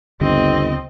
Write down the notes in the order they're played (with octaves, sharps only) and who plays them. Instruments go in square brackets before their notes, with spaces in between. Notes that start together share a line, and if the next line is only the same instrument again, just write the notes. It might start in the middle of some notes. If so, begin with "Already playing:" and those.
[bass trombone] G1 [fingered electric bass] D2 C#3 B3 [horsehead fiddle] C4 D#5